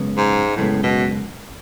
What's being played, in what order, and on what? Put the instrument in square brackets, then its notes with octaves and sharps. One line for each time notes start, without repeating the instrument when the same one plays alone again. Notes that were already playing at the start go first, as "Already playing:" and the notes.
Already playing: [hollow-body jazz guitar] F#2 C#3 G#3 B3
[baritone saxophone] G#2
[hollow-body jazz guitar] F#2 C#3 G#3 B3 [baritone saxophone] A2
[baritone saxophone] B2